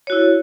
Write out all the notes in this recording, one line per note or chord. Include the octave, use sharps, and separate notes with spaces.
E4 F#4 C#5